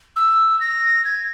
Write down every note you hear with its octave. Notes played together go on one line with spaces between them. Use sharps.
E6
A#6
G#6